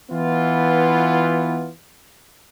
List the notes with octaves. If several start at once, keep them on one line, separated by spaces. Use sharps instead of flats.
E3 B3 F4